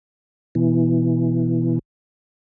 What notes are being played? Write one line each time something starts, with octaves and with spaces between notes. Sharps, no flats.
B2 E3